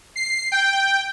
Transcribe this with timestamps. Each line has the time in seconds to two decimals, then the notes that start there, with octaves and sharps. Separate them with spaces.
0.16 C7
0.52 G5